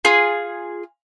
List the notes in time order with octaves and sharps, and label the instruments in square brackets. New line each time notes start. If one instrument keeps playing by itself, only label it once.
[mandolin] F4 G#4